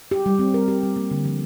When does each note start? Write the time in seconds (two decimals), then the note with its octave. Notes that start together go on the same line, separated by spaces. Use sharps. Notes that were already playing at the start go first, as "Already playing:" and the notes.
0.11 G4
0.26 G3
0.39 C4
0.54 A#4
0.68 G4
0.83 G3
0.96 A#3
1.11 D3
1.25 F3